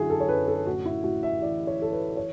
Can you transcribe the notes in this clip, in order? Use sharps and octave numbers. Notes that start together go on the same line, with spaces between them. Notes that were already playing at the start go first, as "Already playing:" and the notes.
Already playing: F#2 D3 F#3 E4 F#4 G#4
A4
C#5
F#2 B4
A4
A2 F#4
E4
A2 F#4
E5
E3 D5
C#5
E3 A4
B4
C#5